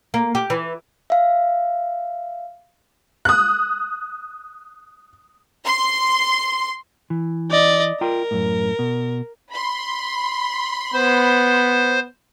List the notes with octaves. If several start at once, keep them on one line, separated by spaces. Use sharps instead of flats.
A#3
G4
E3
E5 F5
D#6 F#6
C6
E3
D5 D#5
F4 A#4 G5 A#5
F#2 A2
B2
B5 C6
B3 C5